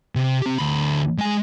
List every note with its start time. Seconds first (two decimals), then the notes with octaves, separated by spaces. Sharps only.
0.15 C3
0.42 C4 G4
0.59 D2 B5
1.18 G#3 G#5